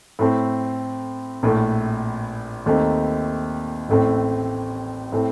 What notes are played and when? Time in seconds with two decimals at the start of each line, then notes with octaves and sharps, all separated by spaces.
0.19 A2 A3 C4
1.43 A#1 A2 A3
2.66 D#2 D#3 A3 C4 D#4
3.89 A1 A2 A3 C4
5.12 A2 A3 C4